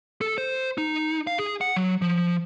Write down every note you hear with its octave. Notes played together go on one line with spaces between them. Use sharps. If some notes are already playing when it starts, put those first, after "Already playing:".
A4
C5
D#4
F5
G#4
F#5
F#3
F3